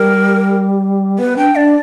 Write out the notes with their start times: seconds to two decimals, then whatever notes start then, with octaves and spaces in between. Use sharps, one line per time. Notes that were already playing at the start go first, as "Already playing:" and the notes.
Already playing: G3 A#4
1.19 B3 B4
1.37 D4 G5
1.55 D4 D5